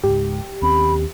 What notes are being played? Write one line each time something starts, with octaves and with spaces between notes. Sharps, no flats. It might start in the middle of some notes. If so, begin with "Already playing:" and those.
C#2 G#2 G4
D#2 C4 C#4 B5